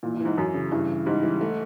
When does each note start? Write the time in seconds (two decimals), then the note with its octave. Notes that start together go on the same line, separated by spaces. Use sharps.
0.03 A#2 E3
0.14 A#2
0.20 G#2 E3
0.37 F#2 E3
0.54 C#3
0.72 G2 E3
0.88 E3
1.06 G#2 G3
1.23 E3
1.41 A3